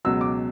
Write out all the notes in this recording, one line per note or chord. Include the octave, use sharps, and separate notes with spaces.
C#2 B2 F#3 E6
D6